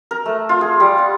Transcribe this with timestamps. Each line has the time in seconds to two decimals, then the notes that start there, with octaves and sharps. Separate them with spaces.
0.11 A#4
0.26 A3
0.49 F4
0.61 G#4
0.80 G3
0.98 F#5